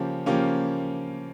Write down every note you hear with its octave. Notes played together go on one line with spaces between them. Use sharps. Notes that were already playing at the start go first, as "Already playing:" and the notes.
Already playing: C#3 F3 A#3 C#4 G4
C#3 F3 A#3 C#4 G4